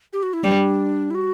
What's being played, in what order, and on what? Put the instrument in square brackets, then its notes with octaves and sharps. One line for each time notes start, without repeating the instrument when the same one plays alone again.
[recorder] G4
F#4
E4
[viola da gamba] G3 [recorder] D4
[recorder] E4
F#4